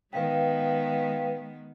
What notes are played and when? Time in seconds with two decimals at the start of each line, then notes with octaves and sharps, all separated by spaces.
0.13 D#3 G#3 B3 B4 F5 G5